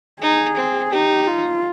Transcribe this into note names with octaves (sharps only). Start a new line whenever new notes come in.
D#4 G#4
C4
D#4 G4
F4